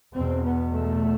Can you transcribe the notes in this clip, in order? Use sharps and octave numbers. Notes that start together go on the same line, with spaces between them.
E2 B2 C4
B3
A3